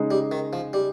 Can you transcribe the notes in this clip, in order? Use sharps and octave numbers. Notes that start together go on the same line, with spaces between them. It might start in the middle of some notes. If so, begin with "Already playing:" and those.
Already playing: C#3 G#3 D#4 G#4
G3
D#3
F3
G3